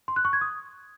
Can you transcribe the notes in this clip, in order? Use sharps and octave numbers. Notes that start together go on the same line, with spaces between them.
C6
F#6
C#6
G#6
D#6